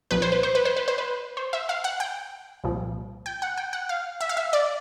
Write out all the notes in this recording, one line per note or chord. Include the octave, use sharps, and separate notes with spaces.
C2 A#2 F3 B4
C5
B4
C5
B4
C5
B4
C5
B4
C5
E5
F5
F#5
G5
C2 A#2 F3
G5
F#5
G5
F#5
F5
E5
F5
E5
D5